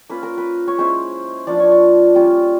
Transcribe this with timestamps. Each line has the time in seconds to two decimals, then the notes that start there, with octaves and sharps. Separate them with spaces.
0.10 A#3 C#4 F4 B4
0.23 A#4
0.38 B4
0.68 C#5
0.78 G#3 C#4 E4 C5
1.47 F3 A#3 D4 F4 D5
1.60 C#5
1.72 D5
2.15 G3 A#3 C#4 F4